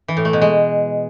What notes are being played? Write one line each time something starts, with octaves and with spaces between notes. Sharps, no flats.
E3
A2
A3
B2
G#3